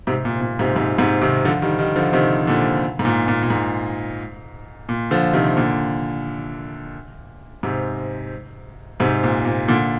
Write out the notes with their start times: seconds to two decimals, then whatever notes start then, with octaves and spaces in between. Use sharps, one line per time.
0.07 G#2 C3
0.25 A#2
0.41 A#2
0.59 G#2 C3
0.76 G#2 C3
0.99 G#2 C3
1.22 C3 D#3
1.45 D3 F3
1.62 D#3 G3
1.79 D#3 G3
1.96 D3 F3
2.13 C3 D#3
2.47 A#2 D3
2.99 G#2
3.05 A#2
3.28 A#2
3.43 A#2
3.50 G#2
4.89 A#2
5.11 D3 F3
5.33 C3 D#3
5.57 A#2 D3
7.63 G#2 C3
9.00 G#2 C3
9.23 A#2
9.45 A#2
9.68 A#2 D3